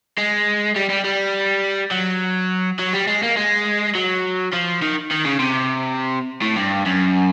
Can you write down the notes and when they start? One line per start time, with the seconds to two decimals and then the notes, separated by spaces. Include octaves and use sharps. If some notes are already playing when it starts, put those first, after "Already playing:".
0.18 G#3
0.76 G3
0.89 G3
1.04 G3
1.91 F#3
2.79 F#3
2.93 G3
3.07 G#3
3.23 A#3
3.37 G#3
3.95 F#3
4.53 F3
4.82 D#3
5.11 D#3
5.25 C#3
5.40 C3
6.41 A2
6.56 G2
6.86 F#2